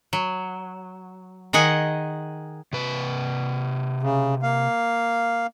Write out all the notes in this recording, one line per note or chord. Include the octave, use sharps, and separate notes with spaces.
F#3
D#3 G#4 D#5 F#5 G#5
C3 B4
C#3
A#3 F5